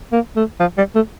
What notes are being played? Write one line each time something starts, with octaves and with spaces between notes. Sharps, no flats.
A#3
A3
F3
G3
A3